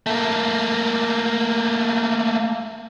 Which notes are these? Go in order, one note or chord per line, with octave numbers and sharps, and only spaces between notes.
A3 A#3